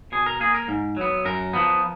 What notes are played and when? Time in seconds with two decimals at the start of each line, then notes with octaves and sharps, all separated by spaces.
0.12 B2 G#4
0.26 A#4
0.40 A#3 G#4
0.54 A#4
0.68 G#2
0.97 F#3 B3
1.25 F#2 A#4
1.53 F3 B3